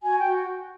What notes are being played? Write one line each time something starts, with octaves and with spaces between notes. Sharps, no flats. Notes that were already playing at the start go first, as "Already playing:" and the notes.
F#4 G#5
G5
F#4